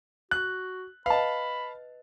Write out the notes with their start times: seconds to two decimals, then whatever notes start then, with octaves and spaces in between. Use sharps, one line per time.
0.31 F#4 F#6
1.06 B4 D#5 F5 A5 B5